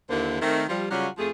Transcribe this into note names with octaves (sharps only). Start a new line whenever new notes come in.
D#2 D3 D#3 A#3 E4 C5
D#3 A3 C4
F3 G3
C#3 F#3 G3 C#4 F4 F#5
F2 F3 A3 G#4